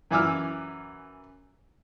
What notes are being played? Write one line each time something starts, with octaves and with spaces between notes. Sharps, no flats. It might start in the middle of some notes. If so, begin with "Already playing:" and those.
F#2 E3 G#5 D6 E6 F6